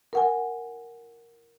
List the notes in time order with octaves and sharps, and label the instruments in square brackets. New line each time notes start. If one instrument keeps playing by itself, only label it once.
[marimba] A#4 F#5 G#5